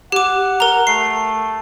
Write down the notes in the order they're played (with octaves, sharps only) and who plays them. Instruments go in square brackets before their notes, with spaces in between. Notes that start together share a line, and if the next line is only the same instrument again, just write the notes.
[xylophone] G4 D6 [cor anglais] F#5
[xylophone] A#4 A#5
[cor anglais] A3 [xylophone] C7